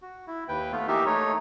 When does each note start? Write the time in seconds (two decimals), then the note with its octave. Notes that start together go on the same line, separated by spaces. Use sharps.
0.02 F#4
0.27 E4
0.48 D#2 B4 G5
0.72 A3 B3 F4
0.88 E3 A#3 D#4 G4 A#4 E5
1.06 A3 D#4 C#5